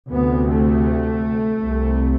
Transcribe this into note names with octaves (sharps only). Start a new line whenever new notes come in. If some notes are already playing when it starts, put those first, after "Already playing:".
D2 C3 B3
A3
C2 C3